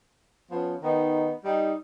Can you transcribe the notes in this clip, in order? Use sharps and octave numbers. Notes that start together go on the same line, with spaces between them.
F3 B3 C#4
D#3 B3 D#4
G3 D#4